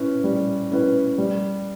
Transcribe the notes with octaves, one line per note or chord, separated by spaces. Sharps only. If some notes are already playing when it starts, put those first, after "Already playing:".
Already playing: C#4 E4 B4
G3
C#4 E4 B4
G3